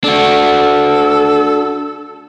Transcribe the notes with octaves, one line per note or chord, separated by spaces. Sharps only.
D4 F#4 A4